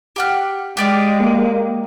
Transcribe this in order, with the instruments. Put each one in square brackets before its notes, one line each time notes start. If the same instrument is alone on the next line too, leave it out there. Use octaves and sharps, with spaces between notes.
[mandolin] G4 F#5 F6
[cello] G#3 [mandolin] G4 D5 F5
[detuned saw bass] A#3